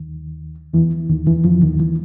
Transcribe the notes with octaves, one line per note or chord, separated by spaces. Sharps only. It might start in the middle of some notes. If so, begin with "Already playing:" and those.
Already playing: D#2 D#3
E2 E3
D#2 D#3
E2 E3
F2 F3
D#2 D#3
E3